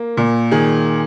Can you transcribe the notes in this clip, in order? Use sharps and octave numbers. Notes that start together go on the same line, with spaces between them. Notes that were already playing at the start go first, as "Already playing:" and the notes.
Already playing: A#3
A#2
D#3 G#4